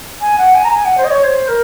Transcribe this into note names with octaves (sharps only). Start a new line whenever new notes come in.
G#5
F#5
G#5
A#5
G#5
F#5
C5
D#5
C#5
C5
A#4